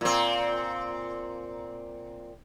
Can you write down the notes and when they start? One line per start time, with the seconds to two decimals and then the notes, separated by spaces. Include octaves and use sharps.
0.01 A#2 C4